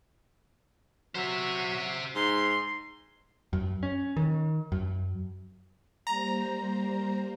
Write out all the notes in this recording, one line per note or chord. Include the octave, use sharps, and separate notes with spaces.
F#3 C5 E5
G#2 C6
F#2
C#4
D#3
F#2
G3 A#3 C5 A#5